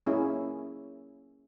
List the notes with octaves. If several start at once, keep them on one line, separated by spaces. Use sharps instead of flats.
A#3 C#4 E4 G#4